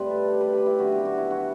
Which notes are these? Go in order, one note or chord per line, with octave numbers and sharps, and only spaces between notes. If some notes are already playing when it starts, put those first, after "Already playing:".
Already playing: A2 G3 C4 B4
A4
G4
B4
G4
E4
F#2 D3 G3 B3 F#4
G4
F#4
E4
F#4